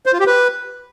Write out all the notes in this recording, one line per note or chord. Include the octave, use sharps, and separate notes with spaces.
C5
F4
G4
B4